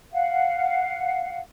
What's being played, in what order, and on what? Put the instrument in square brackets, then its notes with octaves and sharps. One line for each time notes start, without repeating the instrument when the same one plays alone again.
[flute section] F5 F#5